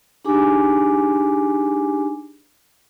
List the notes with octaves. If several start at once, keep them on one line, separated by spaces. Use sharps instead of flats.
D4 D#4 G4 G#4 G#5 D6